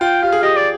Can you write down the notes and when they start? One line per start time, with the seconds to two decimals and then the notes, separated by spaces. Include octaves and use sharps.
0.01 F4 G5
0.23 G4 F5
0.32 G#4
0.43 G4 D#5
0.57 D5